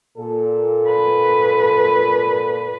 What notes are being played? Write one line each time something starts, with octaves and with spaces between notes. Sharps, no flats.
A#2 A4
B4